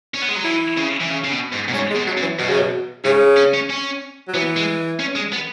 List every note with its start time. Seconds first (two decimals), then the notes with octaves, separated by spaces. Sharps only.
0.14 C#4
0.22 B3
0.29 G#3
0.36 F#3
0.44 E3 E4
0.77 C#3
1.00 E3
1.10 C#3
1.24 C#3
1.31 B2
1.52 G#2
1.68 B2
1.74 G#2 C#4
1.90 G#3
1.96 B2
2.07 F#3
2.17 F#2
2.22 E3
2.39 F#2 B2
2.49 C#3
2.59 B2
3.04 G#2 C#3
3.37 C#4
3.54 C#4
3.70 C#4
4.28 F#3
4.34 E3 B3
4.57 G#3
5.00 C#4
5.16 G#3
5.33 B3